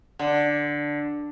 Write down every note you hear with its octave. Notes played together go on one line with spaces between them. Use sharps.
D3